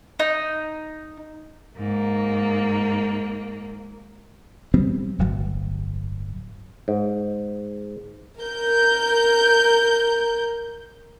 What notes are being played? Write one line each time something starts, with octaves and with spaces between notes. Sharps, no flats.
D#4
G#2 A#3
F#3 G3 B3 C4
D1 G1 F#3
G#2
A#4 G6